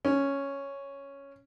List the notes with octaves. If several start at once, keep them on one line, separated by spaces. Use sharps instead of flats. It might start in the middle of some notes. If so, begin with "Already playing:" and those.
C#4